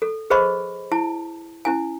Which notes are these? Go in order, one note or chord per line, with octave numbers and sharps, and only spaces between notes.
A4
G#4 B4 C5 D#5 B5 C#6
E4 A5
C#4 E4 G#5